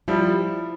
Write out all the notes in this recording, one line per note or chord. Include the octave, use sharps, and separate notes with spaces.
F3 G3 E4